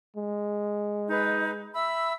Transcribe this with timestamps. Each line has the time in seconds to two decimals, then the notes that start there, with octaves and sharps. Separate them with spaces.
0.16 G#3
1.10 D#4 B4
1.73 E5 B5 E6